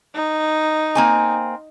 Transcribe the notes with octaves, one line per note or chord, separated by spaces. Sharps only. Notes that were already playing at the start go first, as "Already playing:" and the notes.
D#4
A#3 C4 G#5